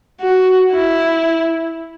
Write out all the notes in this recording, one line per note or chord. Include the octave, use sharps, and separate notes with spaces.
F#4
E4